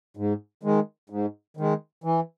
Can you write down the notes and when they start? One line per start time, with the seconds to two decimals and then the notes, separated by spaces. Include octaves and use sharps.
0.17 G#2
0.63 D#3 G#3
1.10 G#2
1.57 D#3 G#3
2.04 E3